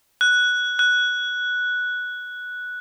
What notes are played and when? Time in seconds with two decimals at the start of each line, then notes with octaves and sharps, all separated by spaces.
0.21 F#6
0.79 F#6